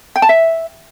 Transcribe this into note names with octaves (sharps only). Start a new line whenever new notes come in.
G5
A5
E5